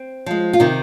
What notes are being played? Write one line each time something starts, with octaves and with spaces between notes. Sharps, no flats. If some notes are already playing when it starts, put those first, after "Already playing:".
Already playing: C4
F3 G#3
F4
C3 D#3 D#4